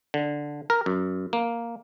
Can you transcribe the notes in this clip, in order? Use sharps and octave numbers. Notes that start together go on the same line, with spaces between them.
D3
A#4
F#2
A#3